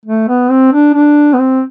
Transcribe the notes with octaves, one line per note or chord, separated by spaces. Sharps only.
A3
B3
C4
D4
D4
B3
C4